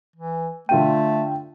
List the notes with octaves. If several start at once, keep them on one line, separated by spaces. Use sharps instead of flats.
E3
D3 A3 F4 G5 D#7